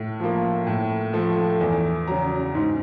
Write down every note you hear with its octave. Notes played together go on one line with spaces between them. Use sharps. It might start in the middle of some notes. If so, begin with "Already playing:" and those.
Already playing: A2
F3 A#3
A2
F3 A3
E2 G#5
C#3 F#3 A#5
G#2